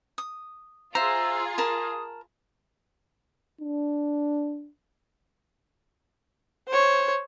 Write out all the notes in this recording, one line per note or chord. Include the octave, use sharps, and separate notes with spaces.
D#6
F4 G#4 C5 E5 A#5 E6
A#4 A5 B5 D#6
D4
C5 C#5